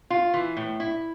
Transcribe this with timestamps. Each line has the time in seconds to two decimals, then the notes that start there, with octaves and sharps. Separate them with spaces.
0.10 F4
0.34 E3
0.57 A2
0.80 E4